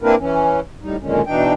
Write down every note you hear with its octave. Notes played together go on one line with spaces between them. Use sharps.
A#3 C4 D4 E4 A#4 B4
E3 C#4
A2 G3 D#4
F#2 A#2 D3 D#3 G#3 C#4
B2 E3 D4 D#4 G5